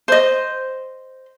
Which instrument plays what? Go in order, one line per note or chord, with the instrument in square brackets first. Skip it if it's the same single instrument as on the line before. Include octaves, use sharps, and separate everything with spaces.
[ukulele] C5 D#5